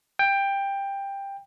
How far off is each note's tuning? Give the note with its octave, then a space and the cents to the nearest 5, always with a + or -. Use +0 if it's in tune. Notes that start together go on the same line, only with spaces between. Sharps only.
G5 +15